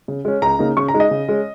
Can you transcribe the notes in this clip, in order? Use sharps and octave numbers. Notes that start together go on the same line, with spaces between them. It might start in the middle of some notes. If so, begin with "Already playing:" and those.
C#3
G#3 C#4
C#2 A#5
C#3 A#3 D#4
C#3 C#6
A#5
G#3 D#4
D#5
C#3
G#3 C#4